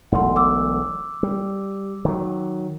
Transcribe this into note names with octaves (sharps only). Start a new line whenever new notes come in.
E1 B1 A3 F#5 C6
D6 E6
G3
D#3 F#3